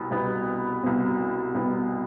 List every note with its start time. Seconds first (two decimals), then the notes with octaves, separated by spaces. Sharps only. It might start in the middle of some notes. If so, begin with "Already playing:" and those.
Already playing: C2 B2 B3
0.11 C2 B2 B3
0.83 C2 B2 B3
1.55 C2 B2 B3